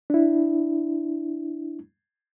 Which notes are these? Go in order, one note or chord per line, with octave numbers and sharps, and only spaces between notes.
D4 E4